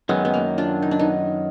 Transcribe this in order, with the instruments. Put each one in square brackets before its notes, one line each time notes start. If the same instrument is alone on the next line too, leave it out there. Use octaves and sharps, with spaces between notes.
[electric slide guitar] F#2 D#3 F#3 [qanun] G#3 B3
[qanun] B3
A#3
D4 F4
D#4
D4
B3 D#4